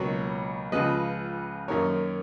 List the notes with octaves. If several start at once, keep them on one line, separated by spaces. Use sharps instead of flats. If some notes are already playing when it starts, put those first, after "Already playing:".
Already playing: C#2 B2 F#3 A#3 C#5
C#2 C#3 F3 G#3 B4 D#5
F#2 D#3 A#3 A#4 C#5